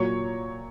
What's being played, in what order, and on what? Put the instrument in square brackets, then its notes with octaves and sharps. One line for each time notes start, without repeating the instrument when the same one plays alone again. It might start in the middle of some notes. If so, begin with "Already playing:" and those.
Already playing: [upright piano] A#2 F#3 C#5